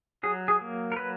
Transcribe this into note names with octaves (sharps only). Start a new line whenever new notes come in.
F#3 G#4
G#4
A#3
A#4
F#3 B4